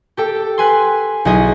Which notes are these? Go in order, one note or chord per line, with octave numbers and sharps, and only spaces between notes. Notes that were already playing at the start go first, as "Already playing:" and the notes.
G4 A4 G5
B4 G#5 C6
B1 E4 G#4 D#5